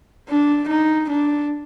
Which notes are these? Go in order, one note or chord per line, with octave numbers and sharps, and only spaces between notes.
D4
D#4
D4